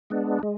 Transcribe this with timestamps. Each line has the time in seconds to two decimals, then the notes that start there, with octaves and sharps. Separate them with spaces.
0.10 G#3 B3 D4
0.43 G#3